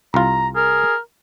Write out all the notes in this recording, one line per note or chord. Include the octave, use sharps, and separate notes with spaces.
C2 F4 A#5
G#4 A#4